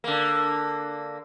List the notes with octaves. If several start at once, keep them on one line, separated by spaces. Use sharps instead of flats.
D3 A#3